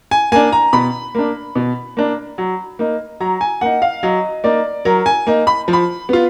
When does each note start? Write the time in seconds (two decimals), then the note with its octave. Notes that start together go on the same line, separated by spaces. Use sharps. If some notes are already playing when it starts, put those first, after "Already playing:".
0.11 G#5
0.32 A#3 D4 G#5
0.52 A#5
0.73 B2 B5
1.15 A#3 D4
1.56 B2
1.97 A#3 D4
2.38 F#3
2.79 A#3 D#4
3.20 F#3 A#5
3.41 G#5
3.61 A#3 D#4 F#5
3.82 F5
4.03 F#3 D#5
4.44 A#3 D#4 D5
4.85 F#3 A#4
5.06 G#5
5.27 A#3 D#4
5.47 B5
5.68 F3
5.73 B5
6.09 B3 F4